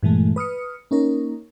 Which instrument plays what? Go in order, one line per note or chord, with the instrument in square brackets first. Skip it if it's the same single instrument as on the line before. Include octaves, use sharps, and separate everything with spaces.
[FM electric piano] G2 A#2 E3 G#3 A3
B4 D#6 F6 C#7
A#3 C#4 D#4 A#4